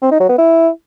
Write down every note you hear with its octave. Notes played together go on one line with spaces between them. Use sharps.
C4
D#4
F#3
B3
E4